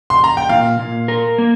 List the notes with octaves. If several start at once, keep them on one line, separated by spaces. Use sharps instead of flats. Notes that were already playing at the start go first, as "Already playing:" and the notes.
C6
A#5
G5
A#2 F5
A#2
A#4
A#3